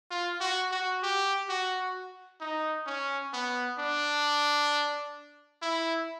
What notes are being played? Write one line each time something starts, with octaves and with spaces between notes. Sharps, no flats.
F4
F#4
F#4
G4
F#4
D#4
C#4
B3
D4
E4